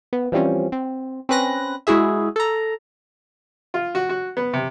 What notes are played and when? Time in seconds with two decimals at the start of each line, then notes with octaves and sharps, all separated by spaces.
0.13 B3
0.32 E3 F3 G3 C4 C#4
0.72 C4
1.29 C4 C#4 B4 F#6 A#6
1.87 G#3 E4 F#4 G#4 E5
2.36 A4 A#5
3.74 F4
3.95 F#4
4.09 F#4
4.37 B3
4.53 C3